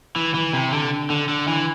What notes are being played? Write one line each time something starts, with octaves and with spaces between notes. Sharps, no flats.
E3
E3
C3
D3
D3
D3
E3